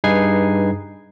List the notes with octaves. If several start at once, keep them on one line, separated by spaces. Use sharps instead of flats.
G2 D#4 G#4 B4 G#6 C7